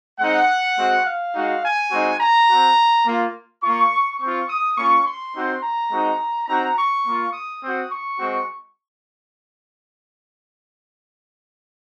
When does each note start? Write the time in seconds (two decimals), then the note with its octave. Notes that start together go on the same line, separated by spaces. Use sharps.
0.19 G#3 C4 D#4 F#5
0.76 G#3 C4 F#4
1.06 F5
1.34 G#3 D#4 F#4
1.63 G#5
1.90 G#3 C4 D#4 F#4
2.20 A#5
2.48 C4 F#4
3.05 A#3 F4
3.62 A#3 F4 C#6
4.19 C4 F4 C#6
4.48 D#6
4.77 A#3 C#4 F4 C#6
5.06 C6
5.34 C4 D#4 F#4
5.63 A#5
5.91 G#3 C4 D#4 F#4
6.47 C4 D#4 F#4 A#5
6.77 C#6
7.05 A#3 F4
7.33 D#6
7.61 C4 F#4
7.91 C#6
8.19 G#3 C4 F#4